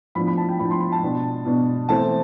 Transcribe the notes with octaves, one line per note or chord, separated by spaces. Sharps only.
A2 F3 B3 D4 B5
B5
A5
G5
A2 F3 B3 D4 B5
C6
B5
A5
B2 B3 D4
B2 B3 D4
E3 A3 C4 A5